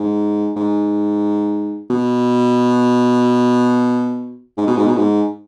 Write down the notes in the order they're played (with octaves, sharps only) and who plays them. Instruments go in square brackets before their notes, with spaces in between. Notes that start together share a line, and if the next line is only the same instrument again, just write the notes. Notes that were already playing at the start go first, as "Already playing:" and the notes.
Already playing: [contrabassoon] G#2
G#2
B2
G#2
B2
G#2
B2
G#2